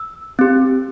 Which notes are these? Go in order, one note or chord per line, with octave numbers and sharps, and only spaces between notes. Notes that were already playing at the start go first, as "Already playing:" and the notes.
Already playing: E6
C4 G4